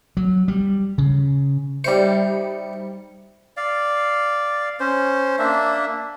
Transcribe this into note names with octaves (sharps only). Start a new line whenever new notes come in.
F#3
G3
C#3
G3 D#4 G4 C5 E5 C#7
D5 F5
C#4 C5
A#3 D4 E5